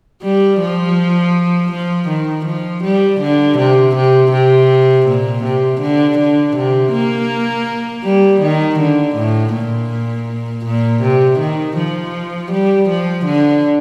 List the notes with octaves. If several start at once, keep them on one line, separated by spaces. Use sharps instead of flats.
G3
F3
F3
D#3
F3
G3
D3
C3
C3
C3
A#2
C3
D3
D3
C3
A#3
G3
D#3
D3
A2
A#2
A#2
C3
D#3
F3
G3
F3
D3